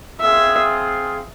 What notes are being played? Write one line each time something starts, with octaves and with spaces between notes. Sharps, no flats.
C4 F4 G#4 E5